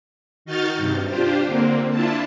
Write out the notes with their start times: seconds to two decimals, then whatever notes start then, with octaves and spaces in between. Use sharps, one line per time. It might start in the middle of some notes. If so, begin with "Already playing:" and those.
0.45 D#3 D#4 F#4 F6 G6 A6
0.77 G2 C3
1.08 D4 F4 G4 C5
1.44 D3 A#3 C4
1.90 D4 E4 F4 A5